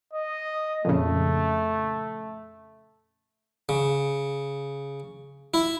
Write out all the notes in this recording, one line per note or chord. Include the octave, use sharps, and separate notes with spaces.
D#5
F2 A#2 C#3 A3
C#3
E4